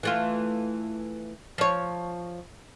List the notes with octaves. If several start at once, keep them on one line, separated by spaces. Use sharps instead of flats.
E3 A3 F4
F3 C#5